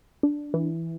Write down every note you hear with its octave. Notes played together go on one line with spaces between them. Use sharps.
D4
E3